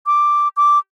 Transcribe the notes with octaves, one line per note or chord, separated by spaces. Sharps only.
D6
D6